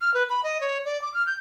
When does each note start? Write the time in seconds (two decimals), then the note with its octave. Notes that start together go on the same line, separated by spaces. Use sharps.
0.01 F6
0.14 B4
0.30 B5
0.43 D#5
0.61 C#5
0.85 D5
1.02 D6
1.14 F6
1.26 G6